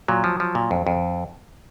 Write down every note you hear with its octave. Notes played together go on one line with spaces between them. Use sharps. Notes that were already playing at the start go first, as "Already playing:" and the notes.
A#2 F#3
F3
F3
A#2
F2
F2